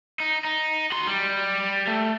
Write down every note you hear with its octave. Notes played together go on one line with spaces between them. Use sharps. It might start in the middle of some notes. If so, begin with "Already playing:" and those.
D#4
D#4
F#4 C6
G3
A3